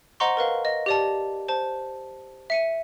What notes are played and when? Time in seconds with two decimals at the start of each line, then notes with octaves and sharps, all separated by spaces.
0.20 C5 D#5 F#5 A#5 C6 C#6
0.37 A#4 B4 F5
0.65 D#5
0.86 G4 D5 A5
1.48 C5 A5
2.50 E5 C#7 D#7